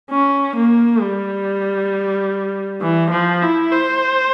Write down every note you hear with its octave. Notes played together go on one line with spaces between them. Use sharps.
C#4
A#3
G3
E3
F3
E4
C5